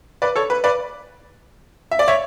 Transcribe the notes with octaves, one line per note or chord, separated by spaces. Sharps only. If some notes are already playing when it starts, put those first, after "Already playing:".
B4 D5
A4 C#5
B4
B4 D5
E5
D5
C#5 E5